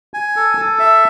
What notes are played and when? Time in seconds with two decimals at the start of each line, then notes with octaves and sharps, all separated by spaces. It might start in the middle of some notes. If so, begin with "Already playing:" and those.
0.14 G#5
0.36 A4
0.58 A4
0.79 E5